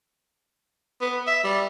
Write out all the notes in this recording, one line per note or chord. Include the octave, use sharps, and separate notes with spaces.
B3
E5
G3